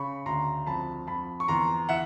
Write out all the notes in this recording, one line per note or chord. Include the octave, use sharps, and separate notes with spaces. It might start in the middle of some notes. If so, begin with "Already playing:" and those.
Already playing: C#3 B5 C#6
D2 A#5 C6
F2 A5 B5
F2 A5 B5
C#6
E2 A#5 C6
E3 E5 F#5